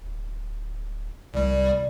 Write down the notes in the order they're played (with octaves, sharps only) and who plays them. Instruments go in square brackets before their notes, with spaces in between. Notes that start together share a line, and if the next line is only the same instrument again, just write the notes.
[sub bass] D1
[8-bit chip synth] C2 G3 [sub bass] C3 [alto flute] D5